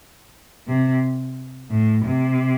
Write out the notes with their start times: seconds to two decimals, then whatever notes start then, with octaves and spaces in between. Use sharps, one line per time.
0.68 C3
1.71 A2
2.06 C3